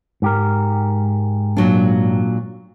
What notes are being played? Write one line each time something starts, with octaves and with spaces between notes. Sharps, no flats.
G#2 G4 A#4
A#2 F#3 D4